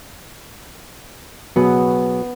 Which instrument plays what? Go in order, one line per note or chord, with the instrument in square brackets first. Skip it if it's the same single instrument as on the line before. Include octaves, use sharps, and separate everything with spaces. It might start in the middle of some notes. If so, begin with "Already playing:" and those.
[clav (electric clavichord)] B2 F#3 G#4 [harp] B3